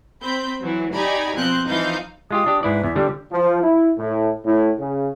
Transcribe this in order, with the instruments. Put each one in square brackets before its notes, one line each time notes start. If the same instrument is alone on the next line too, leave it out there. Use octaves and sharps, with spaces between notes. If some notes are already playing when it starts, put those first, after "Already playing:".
[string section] C4 B5 G6
E3 F#3
D#4 G4 D5 G#5 A#5 B5
B2 F3 C4 F#6 G6
E3 F3 D#4 F5 G6
[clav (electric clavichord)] G#3 F4 G4 [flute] D#6
[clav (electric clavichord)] D4 G4
[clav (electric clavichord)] G#2 E4 D5 [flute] B4
[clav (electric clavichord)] E2 [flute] E5
[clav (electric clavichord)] D3 G3 [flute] G4
[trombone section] F3
E4
A2
A2
C#3